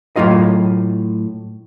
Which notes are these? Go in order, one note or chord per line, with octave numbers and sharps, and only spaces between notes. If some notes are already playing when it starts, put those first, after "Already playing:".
A2 F#3 F4 D#5